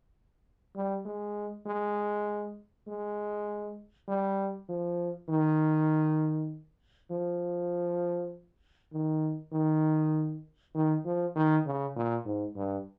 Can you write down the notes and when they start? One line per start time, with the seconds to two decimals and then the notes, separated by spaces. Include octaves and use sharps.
0.76 G3
1.05 G#3
1.66 G#3
2.88 G#3
4.08 G3
4.69 F3
5.29 D#3
7.11 F3
8.93 D#3
9.53 D#3
10.75 D#3
11.05 F3
11.36 D#3
11.66 C#3
11.96 A#2
12.25 G#2
12.56 G2